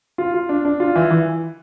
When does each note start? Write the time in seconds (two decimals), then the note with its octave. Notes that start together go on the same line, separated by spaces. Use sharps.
0.18 F4
0.34 F4
0.49 D4
0.65 D4
0.80 F4
0.96 E3
1.10 E3